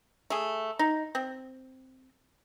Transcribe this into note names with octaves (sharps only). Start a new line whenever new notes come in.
A3 G#4
D#4
C4